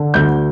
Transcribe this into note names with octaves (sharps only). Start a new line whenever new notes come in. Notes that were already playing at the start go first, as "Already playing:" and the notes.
Already playing: D3
D2 G6